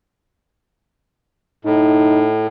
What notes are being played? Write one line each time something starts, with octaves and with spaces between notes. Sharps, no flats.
A2 D#4